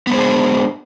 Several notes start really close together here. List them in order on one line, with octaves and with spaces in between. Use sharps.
B3 G#3 C5 G#4 D4